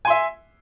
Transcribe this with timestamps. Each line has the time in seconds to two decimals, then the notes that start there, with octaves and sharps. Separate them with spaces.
0.05 G#5
0.07 C6
0.10 E5